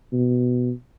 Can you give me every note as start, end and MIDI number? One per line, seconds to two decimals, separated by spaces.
0.13 0.71 47